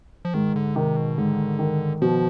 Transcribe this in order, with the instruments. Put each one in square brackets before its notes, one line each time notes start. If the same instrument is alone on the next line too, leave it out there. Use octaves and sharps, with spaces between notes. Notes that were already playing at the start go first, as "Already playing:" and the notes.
[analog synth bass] F3
[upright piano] G#2 [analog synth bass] D#3
[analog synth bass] D3
[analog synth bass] C3 [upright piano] D#3
[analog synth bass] B2
[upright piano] G#2 [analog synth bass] D3
[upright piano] D#3
[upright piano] B2 [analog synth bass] F3